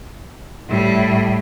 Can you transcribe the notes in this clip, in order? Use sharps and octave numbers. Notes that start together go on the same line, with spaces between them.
A2 G3